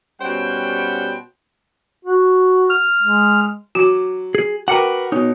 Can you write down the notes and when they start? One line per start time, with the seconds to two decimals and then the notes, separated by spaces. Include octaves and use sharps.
0.21 B2 G3 C#4 C5 F#5 G5
2.05 F#4
2.70 F6
3.02 G#3
3.75 F#3 F#4 D6
4.35 G#4
4.68 F#4 A#4 B4 F#5 G5 D6 C#7
5.12 B2 D#4 C#5